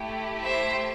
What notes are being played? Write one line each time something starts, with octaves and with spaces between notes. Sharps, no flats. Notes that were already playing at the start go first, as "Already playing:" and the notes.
Already playing: A3 E4 G4
C5 E5